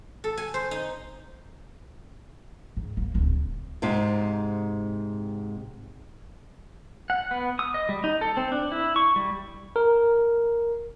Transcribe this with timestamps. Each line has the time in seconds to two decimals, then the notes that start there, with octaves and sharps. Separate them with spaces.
0.24 A4
0.37 G#5
0.54 C5
0.71 D#4
2.77 G#2
2.97 A#3 B3
3.14 D1 C#2
3.82 G#2 C3
7.10 F#5
7.31 B3
7.59 D#6
7.74 D#5
7.89 G3
8.04 D#4
8.21 A4
8.37 C4
8.52 D4
8.72 E4
8.96 C#6
9.16 G3
9.76 A#4